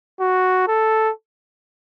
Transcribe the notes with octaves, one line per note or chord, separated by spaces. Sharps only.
F#4
A4